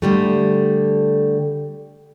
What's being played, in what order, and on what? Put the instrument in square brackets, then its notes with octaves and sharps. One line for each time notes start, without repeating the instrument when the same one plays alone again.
[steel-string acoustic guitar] D3 G3 A3